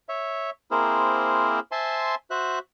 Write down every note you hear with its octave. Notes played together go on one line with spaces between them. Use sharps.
C#5 E5
A#3 C4 E4 G#4 A#4 C5
C5 E5 G#5 A5 C6
F#4 C5 E5 F#6